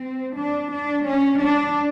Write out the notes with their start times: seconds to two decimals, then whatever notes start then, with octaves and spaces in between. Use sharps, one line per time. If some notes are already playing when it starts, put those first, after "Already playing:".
Already playing: C4
0.37 D4
0.72 D4
1.07 C#4
1.41 D4